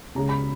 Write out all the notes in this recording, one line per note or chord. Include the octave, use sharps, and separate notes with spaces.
C#2 C#3 G#3 A#5
B5